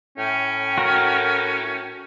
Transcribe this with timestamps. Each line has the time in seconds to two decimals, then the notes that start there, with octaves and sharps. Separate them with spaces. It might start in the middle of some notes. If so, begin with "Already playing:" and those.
0.18 A2 C#4 G5
0.78 F#4 A#4